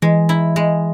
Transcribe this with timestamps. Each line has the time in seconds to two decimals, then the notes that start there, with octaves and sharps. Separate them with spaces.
0.02 E3 G#3
0.29 E4
0.56 G#3